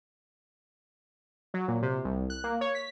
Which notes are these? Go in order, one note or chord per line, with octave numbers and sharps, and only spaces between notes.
F#3
A#2
C3
C2
F#6
A#3
C#5
B6